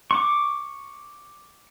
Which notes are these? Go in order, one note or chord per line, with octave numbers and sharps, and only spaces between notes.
C#6 D6